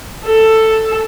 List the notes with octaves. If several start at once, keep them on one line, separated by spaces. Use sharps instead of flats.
A4